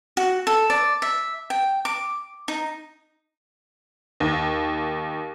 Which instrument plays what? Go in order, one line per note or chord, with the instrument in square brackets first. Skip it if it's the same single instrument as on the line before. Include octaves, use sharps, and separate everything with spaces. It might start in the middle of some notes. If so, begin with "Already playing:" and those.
[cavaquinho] F#4
A4
D5
E5
G5
D6
D#4
[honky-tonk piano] D#2